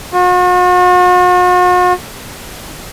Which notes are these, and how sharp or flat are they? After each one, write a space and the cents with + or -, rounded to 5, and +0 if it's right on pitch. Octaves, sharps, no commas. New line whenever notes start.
F#4 -45